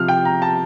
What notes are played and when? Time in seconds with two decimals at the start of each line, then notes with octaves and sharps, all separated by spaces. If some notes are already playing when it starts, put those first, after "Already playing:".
Already playing: C3 F3 F6
0.08 G5
0.25 A#5
0.42 A5